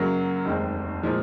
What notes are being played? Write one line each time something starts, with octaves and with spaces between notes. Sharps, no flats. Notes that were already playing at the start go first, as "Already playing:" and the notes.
Already playing: F#2 C#3 F#3 A#3
F1 D#2 D#3 G#3 C4
A#2 F3 G#3